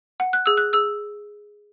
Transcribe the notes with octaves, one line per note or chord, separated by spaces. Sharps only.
F#5
F#6
G#4 E6
F#6
G#4 E6